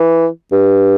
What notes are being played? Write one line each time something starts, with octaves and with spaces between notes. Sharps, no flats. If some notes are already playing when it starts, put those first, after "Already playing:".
Already playing: E3
G2